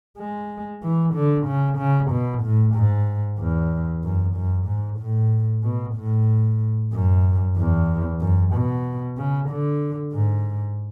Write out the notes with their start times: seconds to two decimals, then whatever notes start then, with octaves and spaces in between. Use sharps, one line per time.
0.18 G#3
0.83 E3
1.15 D3
1.46 C#3
1.78 C#3
2.11 B2
2.43 A2
2.75 G#2
3.39 E2
4.03 F#2
4.35 F#2
4.67 G#2
5.00 A2
5.63 B2
5.96 A2
6.93 F#2
7.57 E2
8.20 F#2
8.54 B2
9.17 C#3
9.50 D3
10.13 G#2